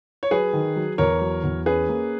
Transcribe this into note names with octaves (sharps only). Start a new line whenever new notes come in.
C#5
F#3 G#4 B4
D#3
F#3
E2 A#4 C#5
F#3
E2
C#4 G#4 B4
A#3